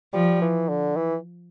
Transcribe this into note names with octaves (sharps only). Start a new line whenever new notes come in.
F3 G3
E3
D3
E3